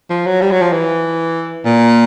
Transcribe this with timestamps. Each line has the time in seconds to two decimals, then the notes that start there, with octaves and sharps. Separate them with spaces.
0.10 F3
0.26 F#3
0.42 G3
0.51 F#3
0.61 F3
0.72 E3
1.65 A#2